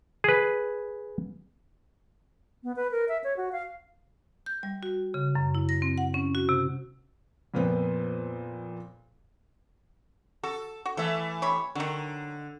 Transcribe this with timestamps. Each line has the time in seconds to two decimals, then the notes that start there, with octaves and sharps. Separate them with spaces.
0.24 G#4 B4
2.63 B3
2.76 B4
2.91 A#4
3.08 E5
3.24 C#5
3.37 F#4
3.52 F5
4.46 G6
4.63 G3
4.83 F#4
5.14 C#3
5.35 F#2
5.55 E4
5.69 A#6
5.82 C4
5.98 F#5
6.14 C#4
6.35 F#4
6.49 C3
7.54 F2 A#2 F3 B3 C4
10.43 F#4 A4
10.86 F#4
10.97 E3 A3 A4 E5
11.42 C3 C#5 B5
11.75 D3 D#3 F#3